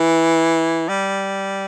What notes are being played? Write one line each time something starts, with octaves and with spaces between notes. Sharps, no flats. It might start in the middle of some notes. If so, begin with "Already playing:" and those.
Already playing: E3
G3